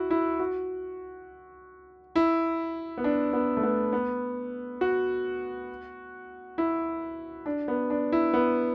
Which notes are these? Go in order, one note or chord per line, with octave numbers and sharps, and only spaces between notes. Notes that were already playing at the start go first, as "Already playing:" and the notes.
Already playing: E4 F#4
E4
F#4
E4
B3
D4
B3
A3
B3
B3
F#4
E4
D4
B3
D4
E4
B3